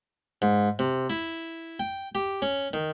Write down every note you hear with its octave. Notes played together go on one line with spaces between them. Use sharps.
G#2
C3
E4
G5
G4
C#4
D#3